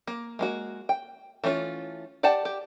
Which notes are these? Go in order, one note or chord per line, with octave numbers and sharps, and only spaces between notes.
A#3
G#3 A#3 F#4
G5
E3 A3 C#4 D4 F4
G4 D5 F#5 G5 A5
G4